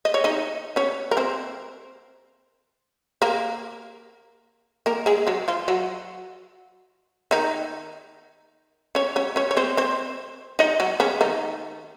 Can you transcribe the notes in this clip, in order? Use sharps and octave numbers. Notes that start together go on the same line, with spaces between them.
D#5
C#5
D#4 D#5
C#4 C#5
A#4
C4 C5
A#3 A#4
A#3 A#4
G#3 G#4
F#3 F#4
F3 F4
F#3 F#4
D#3 D#4
C#4 C#5
C#4 C#5
C#4 C#5
C#5
C4 C5
C4 C5
D#4 D#5
F#3 F#4
C#3 C#4
D#3 D#4